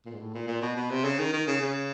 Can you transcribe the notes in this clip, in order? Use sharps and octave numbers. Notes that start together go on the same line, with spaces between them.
A#2
G#2
A2
A#2
A#2
B2
B2
C3
C#3
D#3
D#3
C#3
C#3